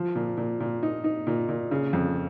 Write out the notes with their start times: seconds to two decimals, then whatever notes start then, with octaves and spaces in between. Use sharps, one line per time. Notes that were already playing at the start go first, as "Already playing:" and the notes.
Already playing: F3
0.15 A#2
0.38 A#2
0.60 A#2
0.83 D#4
1.04 D#4
1.27 A#2
1.49 A#2
1.71 C#3
1.93 F2